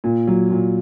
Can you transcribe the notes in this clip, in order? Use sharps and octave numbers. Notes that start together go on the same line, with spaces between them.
A#2
F#3
A#2